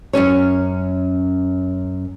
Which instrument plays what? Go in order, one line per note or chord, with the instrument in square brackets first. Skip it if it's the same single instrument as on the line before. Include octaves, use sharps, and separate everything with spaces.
[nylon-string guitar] F#2 B2 C#4 C#5